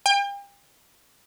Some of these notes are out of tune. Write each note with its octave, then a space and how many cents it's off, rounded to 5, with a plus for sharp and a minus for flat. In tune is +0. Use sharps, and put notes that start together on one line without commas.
G5 +40